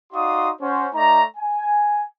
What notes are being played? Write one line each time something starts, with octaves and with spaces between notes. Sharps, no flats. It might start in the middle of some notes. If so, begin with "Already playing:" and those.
D#4 F#4 D5 F5 C6 D#6
C#4 F#4 C5
A3 D#4 D5 A#5
G#5